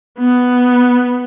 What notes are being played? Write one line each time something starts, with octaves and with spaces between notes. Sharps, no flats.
B3